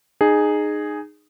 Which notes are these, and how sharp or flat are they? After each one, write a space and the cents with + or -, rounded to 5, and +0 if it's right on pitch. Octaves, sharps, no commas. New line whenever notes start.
D#4 -25 G#4 +0